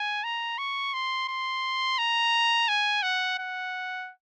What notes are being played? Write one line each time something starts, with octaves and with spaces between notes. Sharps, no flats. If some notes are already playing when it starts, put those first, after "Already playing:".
Already playing: G#5
A#5
C#6
C6
C6
A#5
G#5
F#5
F#5